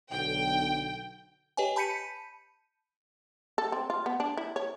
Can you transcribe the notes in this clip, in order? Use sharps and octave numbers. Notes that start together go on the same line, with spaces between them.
B1 D3 G5
G4 B4 C#5 D#5 G5 G#5
A5 B5 G6 B6 C#7 D#7
A4
C4
F4
B3
D4
E4
C#5